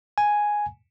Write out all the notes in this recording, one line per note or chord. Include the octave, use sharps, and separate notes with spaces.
G#5